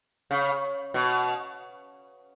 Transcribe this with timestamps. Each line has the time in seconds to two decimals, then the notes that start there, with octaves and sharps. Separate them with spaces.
0.31 C#3
0.94 B2